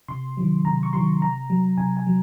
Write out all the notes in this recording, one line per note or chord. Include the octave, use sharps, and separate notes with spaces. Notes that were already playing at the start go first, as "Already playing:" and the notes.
C3 C6
D#3 F#3
C3 A#5
C#6
D#3 F#3 C6
C3 A#5
F#3
C3 G#5
G#5
F#3